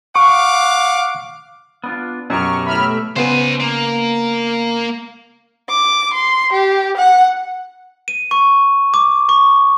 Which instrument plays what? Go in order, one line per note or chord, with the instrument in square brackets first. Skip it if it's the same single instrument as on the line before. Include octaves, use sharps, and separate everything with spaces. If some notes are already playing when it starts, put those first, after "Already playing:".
[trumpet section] F5 F#5 D6 [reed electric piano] C#6
[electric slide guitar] B3 D4 F4
[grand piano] F#2 [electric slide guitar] B2 G4 A#5 [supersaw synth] C#6 F6
[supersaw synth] A2 E5 [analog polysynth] B5 F6
[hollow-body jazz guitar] C#3 B3 B4 [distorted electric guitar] C5 G#5
[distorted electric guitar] A#3
[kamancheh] D6
C6
G4
F#5
[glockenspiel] D#7
C#6
D6
C#6